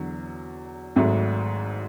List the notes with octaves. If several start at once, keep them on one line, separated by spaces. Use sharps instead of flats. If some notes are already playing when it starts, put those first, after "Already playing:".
Already playing: E2 D3 F#3
G#1 G#2 F#3 A3